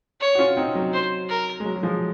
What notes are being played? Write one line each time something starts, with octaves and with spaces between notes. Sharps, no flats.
C#5
F#4
C#4 F4
C4 D#4
F#3
C5
A#4
G#3
F#3
F#3
F3 G#3